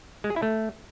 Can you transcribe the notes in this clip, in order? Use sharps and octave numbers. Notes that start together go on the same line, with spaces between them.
G#3
G#4
E4
A3